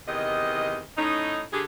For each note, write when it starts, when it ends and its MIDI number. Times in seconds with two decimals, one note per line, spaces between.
0.08 0.83 40
0.08 0.83 48
0.08 0.83 51
0.08 0.83 75
0.98 1.43 45
0.98 1.43 61
0.98 1.43 63
1.53 1.64 50
1.53 1.64 67
1.53 1.64 68